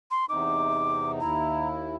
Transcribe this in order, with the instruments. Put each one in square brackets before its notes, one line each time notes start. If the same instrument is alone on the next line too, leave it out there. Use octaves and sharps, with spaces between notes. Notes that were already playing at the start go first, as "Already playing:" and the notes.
[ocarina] C6
[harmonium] E2 C3 D#4 [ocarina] D6
[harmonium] D#2 E4 [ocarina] A#5